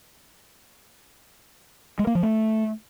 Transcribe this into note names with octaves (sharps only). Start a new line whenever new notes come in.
G#3
A#3
F3
A3